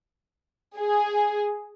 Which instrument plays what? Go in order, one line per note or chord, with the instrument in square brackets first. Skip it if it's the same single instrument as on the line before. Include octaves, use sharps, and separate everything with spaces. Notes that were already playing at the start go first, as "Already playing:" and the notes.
[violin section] G#4